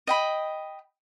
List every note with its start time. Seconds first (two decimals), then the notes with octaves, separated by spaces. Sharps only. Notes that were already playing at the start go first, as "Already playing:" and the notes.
0.07 D#5 G5 B5